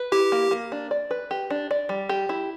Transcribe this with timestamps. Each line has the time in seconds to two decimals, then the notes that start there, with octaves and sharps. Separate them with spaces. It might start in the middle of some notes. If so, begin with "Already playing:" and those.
Already playing: B4
0.12 E4 G4
0.32 A#3
0.51 A#3
0.72 D4
0.91 D5
1.11 B4
1.31 G4
1.50 D4
1.71 D5
1.89 G3
2.09 G4
2.29 E4